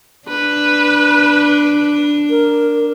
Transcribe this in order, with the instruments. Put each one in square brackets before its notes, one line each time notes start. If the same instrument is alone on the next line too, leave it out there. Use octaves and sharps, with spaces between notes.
[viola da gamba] D4 [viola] B4
[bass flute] A#4